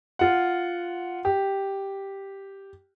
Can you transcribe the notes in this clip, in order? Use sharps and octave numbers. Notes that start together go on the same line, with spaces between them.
F4 F#5
G4